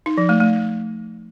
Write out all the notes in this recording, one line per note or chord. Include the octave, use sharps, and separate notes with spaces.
D#4
F3
A3
A3